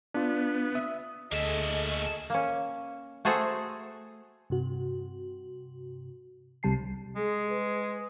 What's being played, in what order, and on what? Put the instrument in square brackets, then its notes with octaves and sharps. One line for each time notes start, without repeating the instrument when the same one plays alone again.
[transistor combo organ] B3 [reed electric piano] D4 F4
[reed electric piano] E5 D#6
[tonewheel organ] D2 C#6 [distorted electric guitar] A#3 E5 [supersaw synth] G#4 A4 [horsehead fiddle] D#5
[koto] A#3 C#4
A3 F#4 G#4 A4 C5 A#5
[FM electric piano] G2 C3 F#4
C2 C3 G3 A5 C7
[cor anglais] G#3 [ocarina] G#4
[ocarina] B4